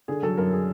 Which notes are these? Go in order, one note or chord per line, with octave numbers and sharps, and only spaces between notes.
D3 G#4
F#3 A4
F#2 A#4
G#4